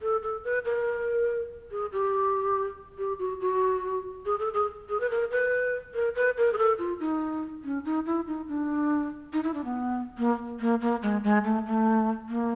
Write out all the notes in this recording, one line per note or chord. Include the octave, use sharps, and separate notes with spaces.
A4
A4
B4
A#4
G#4
G4
G4
F#4
F#4
G#4
A4
G#4
G#4
B4
A#4
B4
A#4
B4
A#4
G#4
A4
F4
D#4
C#4
D#4
E4
D#4
D4
D#4
E4
D4
B3
A#3
A#3
A#3
G#3
G#3
A3
A3
A#3